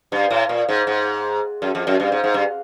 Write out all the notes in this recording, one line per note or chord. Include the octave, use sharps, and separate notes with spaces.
G2
A2
A#2
G#2
G#2
F#2
F2
F#2
G2
G#2
G#2
G2